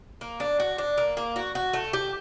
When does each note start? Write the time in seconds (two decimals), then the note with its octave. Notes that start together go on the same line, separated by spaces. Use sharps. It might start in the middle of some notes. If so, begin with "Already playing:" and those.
0.21 A#3
0.40 D4
0.60 F#4
0.78 D4
0.98 A#3
1.17 A#3
1.36 F#4
1.55 F#4
1.73 A3
1.93 G4